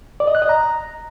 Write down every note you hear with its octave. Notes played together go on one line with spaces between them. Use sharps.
D5
D#5
F#6
D#5
A#5